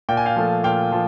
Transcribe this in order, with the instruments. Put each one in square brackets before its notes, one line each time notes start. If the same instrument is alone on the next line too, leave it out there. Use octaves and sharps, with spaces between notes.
[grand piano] A#2 G5
G#5
F5 G5
F3 A3
A#2 F5 G5
F3